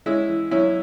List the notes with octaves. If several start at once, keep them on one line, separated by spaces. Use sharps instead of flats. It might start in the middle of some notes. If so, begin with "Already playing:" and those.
G#3 C#4 E4
E3
F#2 C#4 E4